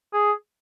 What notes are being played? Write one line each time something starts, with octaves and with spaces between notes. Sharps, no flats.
G#4